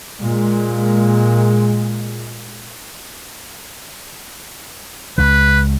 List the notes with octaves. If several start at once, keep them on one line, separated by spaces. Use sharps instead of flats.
A#2 G#3
C#2 C#3 B4